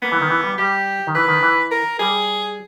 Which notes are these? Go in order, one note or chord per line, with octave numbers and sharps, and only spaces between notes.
A#3 B3
E3
D#3
E3
G3
G3 G4
D#3
E3 B4
D#3
E3
A#4
G3 G#4